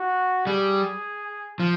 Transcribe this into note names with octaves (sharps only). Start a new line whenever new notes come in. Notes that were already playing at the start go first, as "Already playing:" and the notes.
Already playing: F#4
G3 G#4
F3